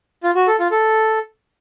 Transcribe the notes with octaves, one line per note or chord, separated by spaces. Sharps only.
F4
F#4
A4
F4
A4